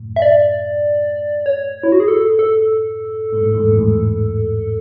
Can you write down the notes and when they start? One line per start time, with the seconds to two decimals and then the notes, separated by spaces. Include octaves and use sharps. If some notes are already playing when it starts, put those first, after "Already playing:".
Already playing: F#2 A2
0.16 E5
0.22 D5
1.46 C#5
1.83 E4
1.92 F#4
2.00 G#4
2.08 A4
2.39 A4
3.33 G#2
3.43 A2
3.55 E2 G#2
3.71 A2
3.79 E2 G#2